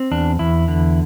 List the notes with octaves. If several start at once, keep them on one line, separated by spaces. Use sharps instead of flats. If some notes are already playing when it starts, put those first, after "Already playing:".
Already playing: C4
E2 D4
E2 E4
D3